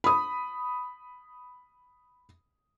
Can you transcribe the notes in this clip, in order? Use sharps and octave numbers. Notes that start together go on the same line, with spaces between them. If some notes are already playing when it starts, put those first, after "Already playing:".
B5 D#6